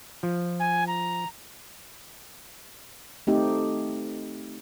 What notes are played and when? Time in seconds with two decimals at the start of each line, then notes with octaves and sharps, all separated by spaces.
0.23 F3
0.59 G#5
0.87 A#5
3.27 A3 C4 D#4 G4